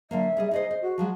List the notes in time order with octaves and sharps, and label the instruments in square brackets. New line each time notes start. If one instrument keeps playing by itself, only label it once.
[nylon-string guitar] D3 F#3 A#3 [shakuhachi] E5
[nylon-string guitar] G3 G#4 D#5
[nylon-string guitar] D#4 G#4 C5 [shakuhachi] D#5
[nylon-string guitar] C5
[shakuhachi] F#4
[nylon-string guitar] F3 F#3 G#3